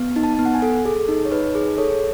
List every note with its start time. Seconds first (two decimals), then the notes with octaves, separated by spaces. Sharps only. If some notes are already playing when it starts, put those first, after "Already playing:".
Already playing: B3
0.16 D#4
0.23 A5
0.39 B3
0.45 F#5
0.55 G#5
0.62 A4
0.85 G#4 A4
1.09 D#4
1.25 C#5
1.32 D#4 B4
1.55 G#4
1.78 A4 C#5